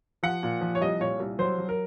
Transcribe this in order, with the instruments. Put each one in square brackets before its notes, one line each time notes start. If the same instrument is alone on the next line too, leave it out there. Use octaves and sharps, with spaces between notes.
[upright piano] F3 F#5
A#2
F3
C#5
C2 D#5
A#2 C#5
C2
F#3 C5
F#3
A#4